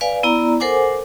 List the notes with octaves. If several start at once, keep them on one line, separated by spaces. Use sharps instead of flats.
B4 D5 F5 G#5
B3 E4 D5 A#5
A4 A#4 C5 F#5 G#5 D6